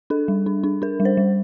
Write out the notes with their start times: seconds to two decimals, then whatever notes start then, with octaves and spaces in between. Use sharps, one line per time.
0.10 D4 A4
0.28 G3
0.46 D4
0.64 D4
0.82 D4 A#4
1.00 G3
1.05 C5
1.17 G3